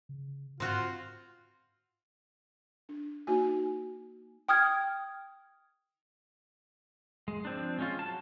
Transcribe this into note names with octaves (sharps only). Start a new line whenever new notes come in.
C#3
G#2 C4 F4 F#4
D4
A#3 D#4 F#4 G#5
G5 D#6 F6 G#6
G#3
F3 C4 D4
G#3 C#4 F4
F#3 A5